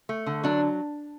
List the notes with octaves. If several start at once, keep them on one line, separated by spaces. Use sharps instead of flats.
A3
D3
F#3 D4